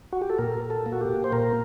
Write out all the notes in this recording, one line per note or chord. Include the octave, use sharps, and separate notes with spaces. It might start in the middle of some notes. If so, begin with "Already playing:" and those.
F#4
G4
A4
A#2 A#4
A4
A#3
F#4
G4
C5
A#2 A#4